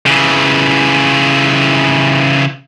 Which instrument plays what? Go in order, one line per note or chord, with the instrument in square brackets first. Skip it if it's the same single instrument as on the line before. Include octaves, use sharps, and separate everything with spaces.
[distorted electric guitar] C#3 E3